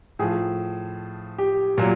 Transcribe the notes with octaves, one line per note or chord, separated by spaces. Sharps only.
A2 F3 G#4
G4
A#2 F#3